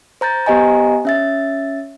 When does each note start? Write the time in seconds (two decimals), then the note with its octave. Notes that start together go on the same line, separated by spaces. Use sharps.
0.21 C5 A#5 G6 A6
0.46 B3 G4 C5 D#5 G#5 A#5
1.05 C#4 E5 A6